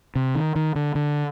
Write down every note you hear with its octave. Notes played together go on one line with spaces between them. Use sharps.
C3
D#3
D#3
D3
D3